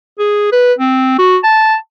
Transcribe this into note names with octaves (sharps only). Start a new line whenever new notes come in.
G#4
B4
C4
F#4
A5